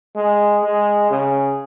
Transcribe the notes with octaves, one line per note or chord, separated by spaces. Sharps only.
G#3
G#3
C#3